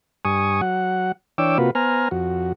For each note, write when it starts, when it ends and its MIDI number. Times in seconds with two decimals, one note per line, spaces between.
0.25 0.61 43
0.25 0.61 80
0.25 0.61 85
0.25 0.61 87
0.61 1.12 54
0.61 1.12 78
1.38 1.58 52
1.38 1.58 62
1.38 1.58 73
1.38 1.58 79
1.38 1.58 86
1.38 1.58 88
1.58 1.71 48
1.58 1.71 58
1.58 1.71 65
1.58 1.71 66
1.58 1.71 71
1.75 2.08 59
1.75 2.08 72
1.75 2.08 80
1.75 2.08 82
1.75 2.08 89
2.11 2.53 41
2.11 2.53 66